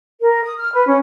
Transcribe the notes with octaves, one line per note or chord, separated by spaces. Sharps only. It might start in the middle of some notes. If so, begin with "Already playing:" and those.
A#4
D#6
F6
B4
C#4